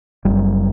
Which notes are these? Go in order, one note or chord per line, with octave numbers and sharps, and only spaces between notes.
F#1 F#2 G3